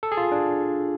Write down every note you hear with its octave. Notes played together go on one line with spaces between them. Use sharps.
A4
G#4
F4
D4